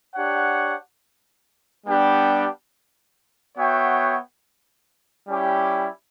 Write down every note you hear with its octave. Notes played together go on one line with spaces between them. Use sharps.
D4 G4 C#5 F#5
G3 B3 D4 G4
B3 F#4 C#5 E5 G5
G3 C#4 E4 G4